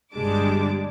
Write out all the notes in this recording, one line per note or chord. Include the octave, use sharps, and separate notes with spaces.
G1 G3 G#3 D4 A5 D6